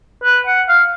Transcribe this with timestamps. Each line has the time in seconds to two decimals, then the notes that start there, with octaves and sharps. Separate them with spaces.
0.24 B4
0.46 F#5
0.68 F5